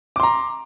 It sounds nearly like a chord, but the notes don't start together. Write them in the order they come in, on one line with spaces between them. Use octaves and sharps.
D6 C6 A#5